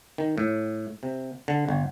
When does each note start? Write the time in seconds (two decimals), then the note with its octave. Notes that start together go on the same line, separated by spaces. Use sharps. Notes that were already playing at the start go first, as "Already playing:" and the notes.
0.18 D#3
0.38 A2
1.03 C3
1.48 D3
1.69 G1